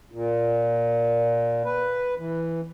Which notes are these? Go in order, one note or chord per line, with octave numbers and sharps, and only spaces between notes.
A#2
B4
E3